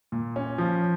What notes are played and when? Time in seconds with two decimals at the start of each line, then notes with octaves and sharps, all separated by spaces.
0.12 A#2
0.36 C#4
0.58 F3